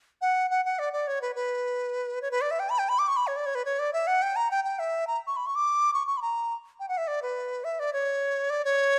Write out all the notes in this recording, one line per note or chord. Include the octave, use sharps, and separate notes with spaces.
F#5
F#5
F#5
D5
D5
C#5
B4
B4
C#5
B4
D5
E5
G5
B5
G5
B5
D6
C#6
B5
C#5
D5
C#5
B4
C#5
D5
E5
F#5
G5
A#5
G5
G5
E5
A#5
C#6
B5
C#6
D6
C#6
C#6
B5
A#5
G5
F#5
E5
D5
B4
E5
D5
C#5
D5
C#5